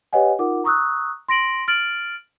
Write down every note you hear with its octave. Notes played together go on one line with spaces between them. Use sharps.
G4 B4 C#5 D#5 F#5 G#5
D#4 F4 A#4 F#5 D6
A#5 C#6 D#6 E6 F#6
C6 A#6 D7 F#7
F6 A6 D7 F#7